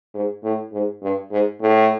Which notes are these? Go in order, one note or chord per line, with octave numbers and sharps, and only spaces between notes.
G#2
A2
G#2
G2
G#2
A2